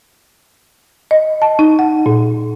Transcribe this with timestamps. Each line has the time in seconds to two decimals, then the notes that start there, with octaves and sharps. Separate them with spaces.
1.11 D#5
1.42 A5
1.59 D#4
1.79 F#5
2.06 A#2